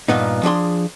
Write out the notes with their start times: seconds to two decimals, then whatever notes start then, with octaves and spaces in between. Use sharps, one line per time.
0.08 G2 A#2 B3 D#4
0.43 F3 D4 G#4 C6